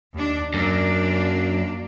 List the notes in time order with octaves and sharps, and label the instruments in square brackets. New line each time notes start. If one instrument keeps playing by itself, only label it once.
[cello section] D#2 D4
[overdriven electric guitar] F#2 [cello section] A#3 D4